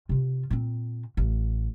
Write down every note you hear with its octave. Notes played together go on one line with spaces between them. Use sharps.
C3 F4
A#2 C4
A1